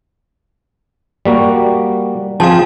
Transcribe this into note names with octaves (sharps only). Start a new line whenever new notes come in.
G3 A#3 F#4
F3 C4 G#4 F5 A5